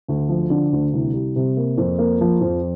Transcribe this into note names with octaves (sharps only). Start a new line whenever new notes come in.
D2
F3
D3
D2
C2
G3
C3
A#3
F2
A#3
F3
F2